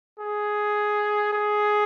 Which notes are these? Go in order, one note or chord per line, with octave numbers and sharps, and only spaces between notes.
G#4
G#4